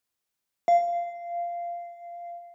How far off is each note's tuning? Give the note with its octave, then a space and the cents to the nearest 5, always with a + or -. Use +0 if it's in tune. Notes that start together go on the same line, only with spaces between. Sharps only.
F5 -15